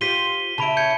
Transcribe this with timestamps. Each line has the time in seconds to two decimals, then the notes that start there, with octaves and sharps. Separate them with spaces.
0.01 F4 G4 C5 B6 D#7 G7
0.58 C#3 E4 A5 B5 D7
0.77 G6 G#6 C#7